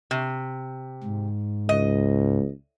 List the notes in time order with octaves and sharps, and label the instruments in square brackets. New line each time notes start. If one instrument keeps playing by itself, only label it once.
[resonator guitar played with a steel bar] C3
[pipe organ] G#2
[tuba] C#2 [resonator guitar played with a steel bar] D#5